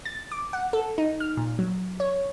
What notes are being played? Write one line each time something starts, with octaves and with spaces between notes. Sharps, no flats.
A6
D6
F#5
A4
D#4
F6
A#2
F#3
C#5